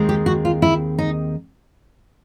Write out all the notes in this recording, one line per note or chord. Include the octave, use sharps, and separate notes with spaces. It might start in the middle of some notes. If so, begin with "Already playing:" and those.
Already playing: D#2 D#3 G#3 C4
G4
F#4
F4
E4
D#4